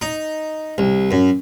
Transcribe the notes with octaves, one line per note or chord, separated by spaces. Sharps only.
D#4
C2
F#2